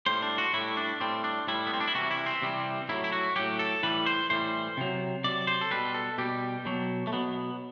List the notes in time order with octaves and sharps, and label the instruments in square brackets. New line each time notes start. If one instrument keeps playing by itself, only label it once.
[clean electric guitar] A2 G3 C5
D4
F#4
A2 G3 E4
D4
A2 G3 C4
D4
A2 G3 E4
B3
C4
D4
E4
C3 E3 G3 F#4
E4
C4
C3 E3 G3
A2 F#3 E4
E4
F#4
A2 F#3 G4
A4
A2 E3 G3 B4
C5
A2 E3 G3 C5
C3 F#3
C3 F#3 D5
C5
A4
B2 G3 B4
A4
B2 G3 G4
B2 F#3
A3
B2 F#3 B3